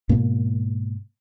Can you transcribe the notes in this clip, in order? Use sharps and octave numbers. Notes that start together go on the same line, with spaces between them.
G#2 B2 A#3